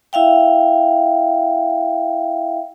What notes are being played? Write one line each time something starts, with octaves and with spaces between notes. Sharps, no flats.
E4 E5 F5 G5